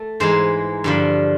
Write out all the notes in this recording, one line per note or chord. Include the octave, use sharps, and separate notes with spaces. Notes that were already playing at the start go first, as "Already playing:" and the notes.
Already playing: A3
G#2 E3 G#3 C5
G2 D3 F3